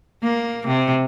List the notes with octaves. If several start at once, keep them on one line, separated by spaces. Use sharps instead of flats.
A#3
C3